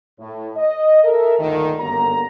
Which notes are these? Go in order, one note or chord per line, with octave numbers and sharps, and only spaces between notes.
A2
D#5
A4 A#4 E5
D2 G2 A#2 D3 D#3
G1 F#2 D3 G3 A#3 A#5